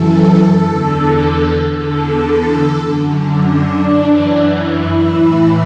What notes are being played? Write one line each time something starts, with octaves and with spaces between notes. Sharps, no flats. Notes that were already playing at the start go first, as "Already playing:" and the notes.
Already playing: F#2 E3 A4
E2 D3
E2 D3 A4
A4
F#2 D3
D4
F#2 E3
E4
A2 E3